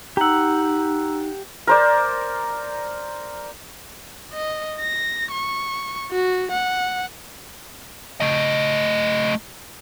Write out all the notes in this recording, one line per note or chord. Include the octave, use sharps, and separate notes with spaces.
D#4 G4 F#5 A#5 E6
A#4 C5 D5
D#5
A#6
C#6
F#4
F#5
A3 D#5